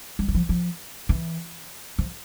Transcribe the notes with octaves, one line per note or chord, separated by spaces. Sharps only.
G3
E3
F3
F3
E3
F3